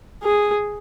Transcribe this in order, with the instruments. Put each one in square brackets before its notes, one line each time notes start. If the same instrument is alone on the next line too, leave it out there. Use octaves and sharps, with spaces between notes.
[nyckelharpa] G#4